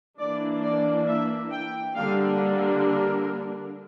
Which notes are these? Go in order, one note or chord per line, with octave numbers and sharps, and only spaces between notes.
E3 A#3 D4 D5
D5
E5
G5
D3 G3 A#3 D4 F5
A#4